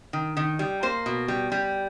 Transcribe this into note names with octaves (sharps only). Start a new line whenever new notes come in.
D#3
D#3
G3
A#3 C5
B2
G3
G3